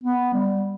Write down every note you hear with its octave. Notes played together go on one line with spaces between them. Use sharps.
B3
G3